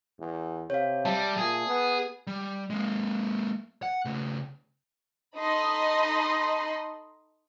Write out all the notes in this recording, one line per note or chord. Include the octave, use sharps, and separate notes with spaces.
E2
C3 C#5 F5
G3 E5 A5
A#2 G#4
B3
G3
G#3 A#3
F#5
C#3 A3
D#4 A4 D#5 B5 C6